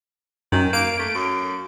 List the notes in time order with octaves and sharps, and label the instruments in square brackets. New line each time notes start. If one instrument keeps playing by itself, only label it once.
[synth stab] F#2 [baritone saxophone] D#3
[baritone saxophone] A#3 [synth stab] D7
[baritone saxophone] A3
F#2